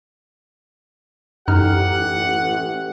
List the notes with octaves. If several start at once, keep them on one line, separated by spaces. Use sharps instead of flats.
A1 F#2 D#4 G4 F#5 F6